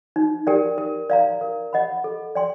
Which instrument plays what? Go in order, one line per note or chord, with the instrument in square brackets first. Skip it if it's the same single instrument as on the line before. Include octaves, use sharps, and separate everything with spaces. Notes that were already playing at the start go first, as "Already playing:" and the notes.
[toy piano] D#4
G4 A#4 D5 G5
A#4
D5 F5 A#5
A#4
D#5 F#5 B5
A4
D5 G5 C6